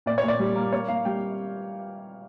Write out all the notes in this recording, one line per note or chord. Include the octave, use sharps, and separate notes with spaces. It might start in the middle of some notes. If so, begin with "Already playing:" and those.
A#2 D5
C#5
A#2
D5
G3
A#3
A#3 C#5
A#3 F5
G3 G5